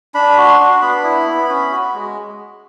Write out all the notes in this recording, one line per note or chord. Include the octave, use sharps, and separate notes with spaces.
D4 B5
F#4
C6
D4
B3 B5
E4
B3
C#4
F#4
G#3